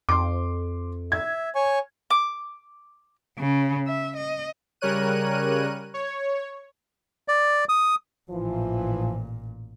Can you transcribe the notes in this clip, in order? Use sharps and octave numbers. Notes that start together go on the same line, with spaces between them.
F2 C6 D6
E5 G#6
C#5 G#5 C#6
D6
C#3
E5
D#5
C#3 G3 A#4 C#5 F#6 D#7
C#5
D5
D#6
A1 A#2 E3 F3